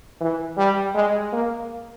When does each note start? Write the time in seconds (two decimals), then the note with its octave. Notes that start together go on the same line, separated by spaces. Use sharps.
0.21 E3
0.58 G3
0.95 G#3
1.33 A#3